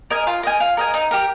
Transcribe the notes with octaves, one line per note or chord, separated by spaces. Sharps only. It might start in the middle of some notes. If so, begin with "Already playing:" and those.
A#4 D#5 G#5
F4
A#4 D#5 G#5
F4
A#4 D#5 G#5
D#4
G4 A#4